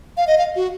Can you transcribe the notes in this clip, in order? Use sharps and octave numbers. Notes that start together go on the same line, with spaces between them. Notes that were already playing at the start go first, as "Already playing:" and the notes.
F5
D#5
F5
F#4